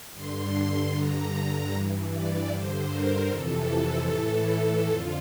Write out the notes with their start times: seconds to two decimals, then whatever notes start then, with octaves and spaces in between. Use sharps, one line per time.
0.13 G2 D3 C6
0.91 G2 D3 A#5
1.71 G2 E3
2.10 D5
2.49 G2 D3 C5
2.89 A#4
3.28 F2 C3 E3 A4
4.08 A2 E3
4.86 F2 D3 F4